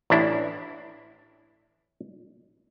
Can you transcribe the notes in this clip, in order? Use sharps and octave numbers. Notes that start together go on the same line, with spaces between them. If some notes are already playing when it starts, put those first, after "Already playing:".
A1 D4 E4